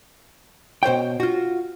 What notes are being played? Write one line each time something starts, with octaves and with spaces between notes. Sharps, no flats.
B2 C5 C#5 G5
F4 F#4